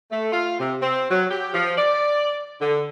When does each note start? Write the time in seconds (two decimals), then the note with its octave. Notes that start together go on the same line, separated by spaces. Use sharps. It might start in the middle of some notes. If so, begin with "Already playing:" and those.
0.11 A3
0.32 F4
0.60 C3
0.82 C4
1.11 F#3
1.31 G4
1.54 F3
1.78 D5
2.61 D3